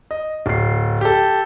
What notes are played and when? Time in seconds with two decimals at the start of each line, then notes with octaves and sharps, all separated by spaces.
0.11 D#5
0.46 D1 C7
1.01 G4 A4